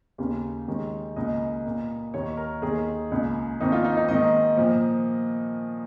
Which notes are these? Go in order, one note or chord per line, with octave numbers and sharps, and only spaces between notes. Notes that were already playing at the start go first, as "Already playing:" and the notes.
D#2 C#3 A#3
D#2 D#3 G#3
C#2 C#3 A#3 D#5
A#2 A#3
D#2 D#3 A#3 C#5
A#4
D#2 D#3 A#3 G#4
C#2 C#3 A#3
F2 D#3 A#3 D#4
F4
D#4
D#4
G#2 D#3 A#3 D#5
A#2 F3 A#3